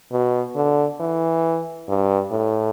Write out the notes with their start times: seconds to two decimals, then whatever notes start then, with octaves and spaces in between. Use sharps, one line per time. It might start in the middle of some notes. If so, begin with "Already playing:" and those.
0.12 B2
0.55 D3
1.00 E3
1.89 G2
2.31 A2